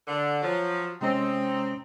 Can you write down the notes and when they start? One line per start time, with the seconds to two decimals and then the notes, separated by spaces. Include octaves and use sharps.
0.07 D3
0.42 F3 F#3
1.01 C3 G#3 C4 C#4 D#4